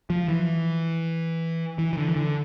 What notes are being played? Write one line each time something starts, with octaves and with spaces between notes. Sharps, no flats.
F3
E3
E3
E3
D3
E3
D3